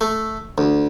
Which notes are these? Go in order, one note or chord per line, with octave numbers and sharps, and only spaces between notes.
A3
D2